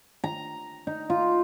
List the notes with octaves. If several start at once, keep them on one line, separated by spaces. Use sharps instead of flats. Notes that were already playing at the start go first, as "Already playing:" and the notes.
A#5
D#4
F4